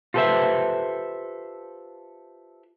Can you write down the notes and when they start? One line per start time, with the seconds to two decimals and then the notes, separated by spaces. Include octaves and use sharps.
0.14 F4 G4 A4 B4 C5 E5